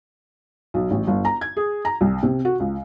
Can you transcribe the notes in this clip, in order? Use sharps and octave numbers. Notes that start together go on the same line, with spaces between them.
B1
A1
G1
A#5
G#6
G#4
A#5
C2
C3
F#4
C#2